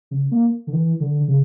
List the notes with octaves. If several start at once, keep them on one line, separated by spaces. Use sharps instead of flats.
C#3
A#3
D3
E3
D3
C#3